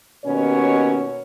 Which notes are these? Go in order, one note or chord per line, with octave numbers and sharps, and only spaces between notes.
D#2 B2 C#4 C#5